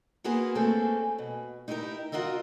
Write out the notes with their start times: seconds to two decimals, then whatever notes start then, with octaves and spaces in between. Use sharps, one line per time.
0.24 A#3 B3 F#4 G#4 A#4 C5
0.55 A3 A#3 C4 C#4 G#4 A4
1.18 B2
1.68 D#4 E4 G4 G#4 A#4
2.12 F4 F#4 A#4 D#5 E5